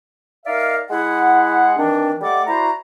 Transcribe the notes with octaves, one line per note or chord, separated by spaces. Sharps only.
D#4 A#4 D5 E5 F5
G#3 E4 G#4 F#5
D#3 E3 C4 D4
G3 A3 A4 D#5 F#5 D6
E4 F#4 C5 D5 A#5